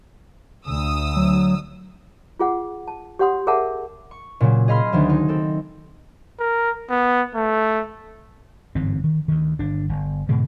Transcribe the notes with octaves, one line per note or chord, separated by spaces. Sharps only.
D2 D#6 E6
F#3
F4 G#4 F#5
A5
G4 C#5 F#5 C6 D#6
G#4 A#4 C#5 E5 F#5 A5
C#6
A#2 C#3 F#3
G#4 D#5 F5 B5 C6 F6
D2 D#3 F#3
D#4
C4 A4
A#4
B3
A3
G1 G#2 E3 C4
D#3
D2 D#3
G1 D4
G1
G#2 B2 D3 G#3